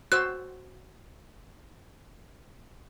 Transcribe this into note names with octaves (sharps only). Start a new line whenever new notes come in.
F#4 C5 E6 F#6